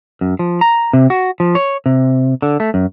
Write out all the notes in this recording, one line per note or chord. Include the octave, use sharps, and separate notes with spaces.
F#2
F3
A#5
C3
F#4
F3
C#5
C3
D3
A3
F#2